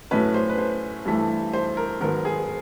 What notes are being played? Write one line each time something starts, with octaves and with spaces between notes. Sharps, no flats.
A2 F#3 A3 C#4 B4
C5
B4
C5
G2 E3 A3
C5
A#4
G#2 D#3 F#3 B3 A#4
G#4